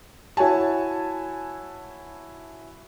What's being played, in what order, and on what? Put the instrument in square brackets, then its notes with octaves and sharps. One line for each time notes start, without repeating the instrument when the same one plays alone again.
[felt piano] E4 F#4 C#5 G#5 A5